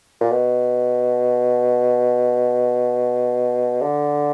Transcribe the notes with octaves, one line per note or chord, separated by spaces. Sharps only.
A#2
B2
D3